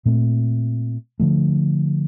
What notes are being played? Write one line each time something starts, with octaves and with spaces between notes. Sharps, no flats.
A#2 A3 C4
D3 F3 A3